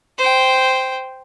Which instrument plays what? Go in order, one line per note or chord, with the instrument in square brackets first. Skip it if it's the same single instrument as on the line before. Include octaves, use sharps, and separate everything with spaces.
[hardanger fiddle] C5 G5